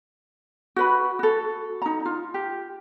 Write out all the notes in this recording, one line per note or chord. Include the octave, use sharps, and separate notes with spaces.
F#4 B4 B5
F#4 A4
D#4 A#5
F4
G4